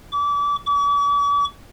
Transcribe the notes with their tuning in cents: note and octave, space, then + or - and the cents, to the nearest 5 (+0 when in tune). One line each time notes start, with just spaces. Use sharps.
D6 -30
D6 -45